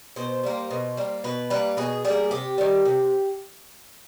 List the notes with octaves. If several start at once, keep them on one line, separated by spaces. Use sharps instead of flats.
B2 C5
G3 A#3
B2
G3 A#3
B2 B4
G3 A#3 B4
B2 G#4
G3 A#3 G#4
C3 G4
D#3 G3
C3